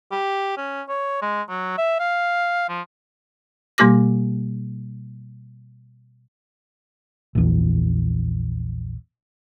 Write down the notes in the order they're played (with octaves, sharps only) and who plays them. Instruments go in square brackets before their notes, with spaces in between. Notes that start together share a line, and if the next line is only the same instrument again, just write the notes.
[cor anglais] G4
C#4
C#5
G#3
F#3
E5
F5
F3
[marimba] B2 G3 A#3 G4 D6 A#6
[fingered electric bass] A#1 E2